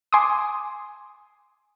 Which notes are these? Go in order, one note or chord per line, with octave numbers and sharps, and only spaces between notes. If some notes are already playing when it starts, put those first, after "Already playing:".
G#5 C6 D6 D#6